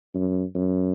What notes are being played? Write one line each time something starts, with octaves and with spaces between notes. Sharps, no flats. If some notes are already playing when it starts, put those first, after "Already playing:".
F#2
F#2